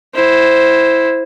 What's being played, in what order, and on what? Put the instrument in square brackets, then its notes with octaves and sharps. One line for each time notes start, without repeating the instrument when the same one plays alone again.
[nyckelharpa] E4 C5